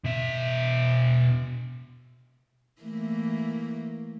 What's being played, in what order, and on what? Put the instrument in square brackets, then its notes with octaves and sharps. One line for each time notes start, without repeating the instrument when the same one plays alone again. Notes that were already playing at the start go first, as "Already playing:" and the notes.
[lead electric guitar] B2 E5
[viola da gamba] E3 A3 A#3